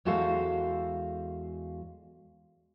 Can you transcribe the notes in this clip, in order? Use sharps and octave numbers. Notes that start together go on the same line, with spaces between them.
E2 G#3 F#4 A4 C5 F5